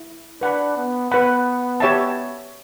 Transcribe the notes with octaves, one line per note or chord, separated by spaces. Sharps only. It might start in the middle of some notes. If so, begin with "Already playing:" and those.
Already playing: E4
D4 B4 F#5 B5
B3
B3 B4 F#5 B5
G4 C#5 E5 A5